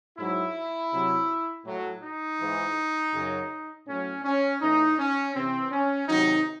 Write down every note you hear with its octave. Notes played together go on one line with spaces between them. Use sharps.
G#2 F#3 E4
C3 F#3
A2 F#3
D#4
G#2 E3
F#2 C#3 F#3
A2 F#3 C#4
C#4
A2 E3 D#4
C#4
C3 E3 C4
C#4
C3 D#3 F#3 D#4